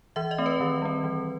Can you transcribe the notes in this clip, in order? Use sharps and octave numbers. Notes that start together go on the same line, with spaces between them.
E3 E5
D#5
A3 C4
B4
D#3
G3 C4
E3